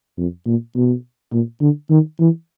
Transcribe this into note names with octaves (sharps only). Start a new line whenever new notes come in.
F2
A#2
B2
A#2
D3
D#3
E3